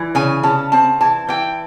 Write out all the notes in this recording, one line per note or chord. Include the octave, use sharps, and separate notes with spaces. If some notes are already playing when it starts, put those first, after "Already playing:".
Already playing: E3
C#3 G#5
C#3 A5
C4 A5
E3 A5
E3 G5